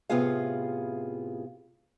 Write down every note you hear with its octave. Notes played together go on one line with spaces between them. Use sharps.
A2 C3 B3 F4 G#4 F5